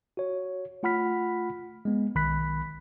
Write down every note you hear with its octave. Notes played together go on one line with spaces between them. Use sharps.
F#4 C#5
A3 F4 F#5 B5 F6 B6
G#3 B3
B1 D#3 B5 F#6 B6